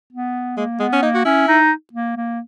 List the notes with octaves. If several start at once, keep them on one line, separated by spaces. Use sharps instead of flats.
B3
G#3 A#3
G#3 B3
C#4
A#3 D#4
F#4
C#4 E4
D#4
A#3
A#3